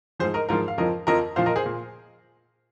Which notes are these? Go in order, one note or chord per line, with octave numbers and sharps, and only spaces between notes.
G#2 F3 G#4 C5
A#4 D#5
G#2 F3 F4 A#4
F5
F2 F3 A#4 D#5
F2 F3 A#4 D#5
A#2 F3 C5 F5
A#4 D#5
G#4 C5
A#2